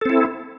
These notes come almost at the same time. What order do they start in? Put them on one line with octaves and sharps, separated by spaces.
A4 C4 E4